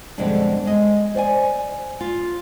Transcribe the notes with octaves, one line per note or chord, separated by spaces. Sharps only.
F2 B2 D3 G3 G#3 D4
G#3 D#5
C5 D5 F#5 G#5
F4